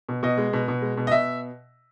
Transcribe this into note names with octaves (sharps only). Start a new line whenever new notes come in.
B2
B2 D#5
G#3
B2
B2
G#3
B2
D#5
B2 E5